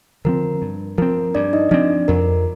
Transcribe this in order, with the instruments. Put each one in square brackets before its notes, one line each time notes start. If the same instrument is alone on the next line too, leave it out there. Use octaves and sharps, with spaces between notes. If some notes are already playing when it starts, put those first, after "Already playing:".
[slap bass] D3 F3 C4 [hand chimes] A#4
[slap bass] G2
[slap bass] F3 C4 [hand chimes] A#4
[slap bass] G2 [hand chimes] D4 D5
[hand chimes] D#4 D#5
[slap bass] F3 C4 [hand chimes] D4 D5
[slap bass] F2 [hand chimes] A#4